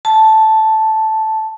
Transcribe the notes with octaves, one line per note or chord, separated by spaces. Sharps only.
A5